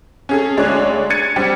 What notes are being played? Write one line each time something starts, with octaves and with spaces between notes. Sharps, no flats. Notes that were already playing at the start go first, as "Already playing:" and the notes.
C#4 G#4 A4
D2 G#3 D4 C#5 F#6
G#6 A6 C#7 D#7
G3 C4 D4